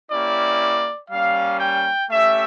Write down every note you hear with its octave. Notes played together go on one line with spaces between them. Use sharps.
A#3 C#4 E4 G4 D5
G3 A#3 C#4 F5
G5
A3 C#4 G4 E5